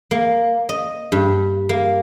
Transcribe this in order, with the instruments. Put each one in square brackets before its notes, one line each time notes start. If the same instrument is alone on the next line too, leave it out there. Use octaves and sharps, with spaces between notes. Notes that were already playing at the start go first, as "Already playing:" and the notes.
[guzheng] A#3
D#5
G2
A#3